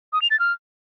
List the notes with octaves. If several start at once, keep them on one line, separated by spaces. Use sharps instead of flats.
D#6
F7
A6
F6